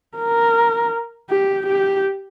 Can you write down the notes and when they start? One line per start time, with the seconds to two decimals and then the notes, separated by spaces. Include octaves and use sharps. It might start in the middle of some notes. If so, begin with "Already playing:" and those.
0.17 A#4
1.29 G4
1.66 G4